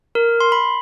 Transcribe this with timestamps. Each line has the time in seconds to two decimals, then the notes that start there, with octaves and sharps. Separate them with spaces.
0.15 A#4
0.40 C6
0.52 B5